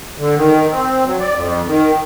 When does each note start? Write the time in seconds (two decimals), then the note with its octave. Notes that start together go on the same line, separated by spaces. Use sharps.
0.18 D3
0.36 D#3
0.70 C4
1.06 F#3
1.20 D5
1.35 F2
1.67 D#3